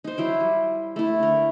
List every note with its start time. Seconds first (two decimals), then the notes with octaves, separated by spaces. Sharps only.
0.04 D#4 C5
0.18 F#3 E4 G5
0.40 G3
0.96 A3 E4
1.20 D3 A#4